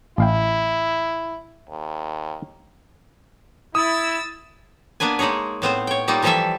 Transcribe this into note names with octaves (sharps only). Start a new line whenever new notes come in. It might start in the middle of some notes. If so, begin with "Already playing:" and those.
A1 E4 F5 G5
D#2
E4 D#6 E6 A6
A#3 B3 D4 B4 G#5
G#3 A#3 D#4 G#4 C#5
A2 B3 C4 C5
C#5 G5
G3 A#3 D#4 F4 G4
E3 F3 G3 G4 A4 E5